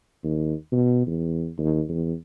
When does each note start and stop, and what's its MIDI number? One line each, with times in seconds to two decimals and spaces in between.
0.23 0.54 39
0.72 1.05 47
1.07 1.49 40
1.58 1.83 39
1.89 2.13 40